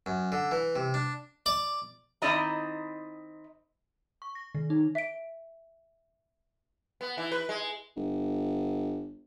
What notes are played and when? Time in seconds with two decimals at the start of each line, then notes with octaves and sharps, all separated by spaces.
0.06 F#2
0.32 D3
0.51 E3
0.76 C3
0.94 D4
1.46 D5
2.22 D#3 C4 E4 D5 D#5 A#5
4.22 C#6
4.35 A#6
4.55 D#3
4.70 D#4
4.95 E5 D7
7.01 B3
7.17 E3
7.32 B4
7.49 G#3
7.96 G1